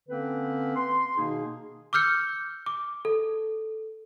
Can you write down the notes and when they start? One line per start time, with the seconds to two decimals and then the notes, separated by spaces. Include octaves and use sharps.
0.09 D3 A#3 C4 C#4 B4
0.76 C6
1.16 B2 D#3 A#3 D#4 G#4
1.93 D6 E6 F6 G6 C#7
2.66 D6
3.05 A4